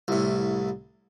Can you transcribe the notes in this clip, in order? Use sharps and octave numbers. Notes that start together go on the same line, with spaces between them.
C2 A2